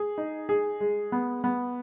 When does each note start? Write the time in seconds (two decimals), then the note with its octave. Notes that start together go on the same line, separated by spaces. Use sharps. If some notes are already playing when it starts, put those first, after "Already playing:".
Already playing: G#4
0.18 D#4
0.49 G#4
0.80 G#3
1.12 B3
1.44 B3